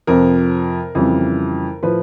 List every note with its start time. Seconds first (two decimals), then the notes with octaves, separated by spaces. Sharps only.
0.07 F2 C3 F3 A#4
0.95 F2 C#3 E3 G3
1.83 A2 F3 B4